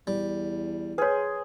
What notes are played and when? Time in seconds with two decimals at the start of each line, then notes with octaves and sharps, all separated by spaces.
0.07 E2 G3
0.98 G#4 B4 C#5 C6